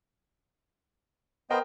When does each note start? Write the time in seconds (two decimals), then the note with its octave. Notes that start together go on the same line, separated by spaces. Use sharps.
1.50 B3 A#4 C5 D#5 G5